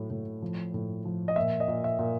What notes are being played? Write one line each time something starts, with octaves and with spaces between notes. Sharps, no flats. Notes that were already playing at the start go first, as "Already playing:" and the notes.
Already playing: A2 F#3
A2
F3
A2
F3
D#5
A#2 E5
D#5
A#2
E5
A#2